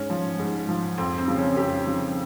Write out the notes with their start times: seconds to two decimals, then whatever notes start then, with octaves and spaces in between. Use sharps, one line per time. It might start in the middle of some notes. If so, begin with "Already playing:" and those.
Already playing: G#2 C#4
0.10 F3
0.40 G#2
0.69 F3
0.98 F2 C4
1.18 C4
1.28 C#3 F3
1.37 C#4
1.57 F2 G4
1.86 C#3 F3